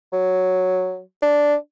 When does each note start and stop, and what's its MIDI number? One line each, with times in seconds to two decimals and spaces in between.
0.13 1.00 54
1.22 1.55 62